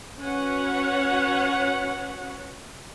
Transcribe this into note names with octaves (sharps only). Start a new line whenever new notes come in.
C#4 F#4 B4 C#5 F#5